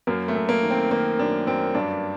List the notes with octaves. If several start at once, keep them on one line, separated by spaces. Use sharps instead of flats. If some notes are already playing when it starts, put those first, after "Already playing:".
F#2 A#3
A3
F#2
A#3
D#3
C4
D#3 A#3
F#2 D4
F#2 C4
G2 D4